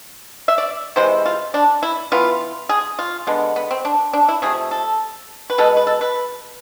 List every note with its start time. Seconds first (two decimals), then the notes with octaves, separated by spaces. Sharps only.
0.48 E5
0.58 D5
0.96 C3 E3 G#3 C5
1.25 F4
1.54 D4
1.82 E4
2.12 E3 B3 F4
2.69 G#4
2.99 F4
3.27 D3 G#3 B3
3.56 B3
3.71 C4
3.85 D4
4.13 D4
4.28 E4
4.42 C3 F3 A3 G#4
4.71 A4
5.50 B4
5.58 B2 G#3 B3 A4
5.77 B4
5.87 A4
6.01 B4